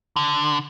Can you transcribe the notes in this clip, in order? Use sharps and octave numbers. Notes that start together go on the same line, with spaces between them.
D3